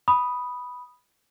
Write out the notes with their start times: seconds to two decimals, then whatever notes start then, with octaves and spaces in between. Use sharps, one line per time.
0.08 B5 D#6